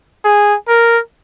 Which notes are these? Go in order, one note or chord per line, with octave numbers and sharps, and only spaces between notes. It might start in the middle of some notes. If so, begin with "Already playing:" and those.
G#4
A#4